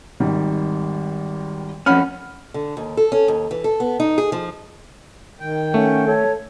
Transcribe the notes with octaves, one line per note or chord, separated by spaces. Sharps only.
G#1 D#3 G3
F2 C#4 F#5 B5 F6
D3
D#2
A4
C#4
D#2
E3
A4
B3
D#4
G#4
F3
D#3 G5
A3 C#4 F#5
A4 C#5